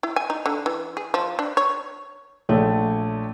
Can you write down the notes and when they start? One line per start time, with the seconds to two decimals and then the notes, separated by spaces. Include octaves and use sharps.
0.03 E4
0.16 G#5
0.30 D#4
0.46 D3
0.66 E3
0.97 G#4
1.14 F3
1.39 D4
1.57 C#5
2.49 A#1 A3 C#5